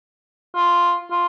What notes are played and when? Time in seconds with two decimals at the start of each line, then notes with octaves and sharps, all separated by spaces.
0.56 F4
1.11 F4